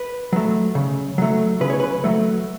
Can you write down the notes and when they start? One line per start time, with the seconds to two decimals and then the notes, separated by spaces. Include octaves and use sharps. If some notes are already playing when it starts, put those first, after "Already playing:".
Already playing: B4
0.33 F#3 A3
0.75 C#3
1.18 F#3 A3
1.61 C#3 B4
1.70 C#5
1.80 B4
2.04 F#3 A3